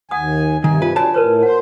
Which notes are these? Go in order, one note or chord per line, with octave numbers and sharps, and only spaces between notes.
D#2 F#5 G#5 D#6
G2 C3 D#3 G#5
F4 B4
D4 F#4 C#5 G#5 A5
A2 A#4 B4 C#5
C5 F#5